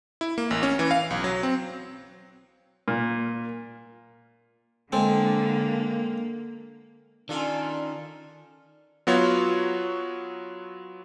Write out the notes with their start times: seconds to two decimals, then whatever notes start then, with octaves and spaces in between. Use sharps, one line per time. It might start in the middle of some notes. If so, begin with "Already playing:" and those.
0.21 E4
0.38 A#3
0.51 A1
0.63 C#4
0.79 E3
0.91 F5
1.10 B1
1.24 F#3
1.43 C4
2.88 A#2
4.92 D3 G#3 A#3 C4 A4
7.29 D#3 C#4 D4 F4 A4
9.07 F#3 B3 F4 F#4 C#5